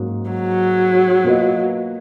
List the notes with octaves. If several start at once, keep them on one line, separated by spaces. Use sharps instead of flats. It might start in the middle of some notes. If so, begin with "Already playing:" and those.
Already playing: G#2 F#3 A#3 C#4 F#4
F#3
B2 A#3 F4 B4 D#5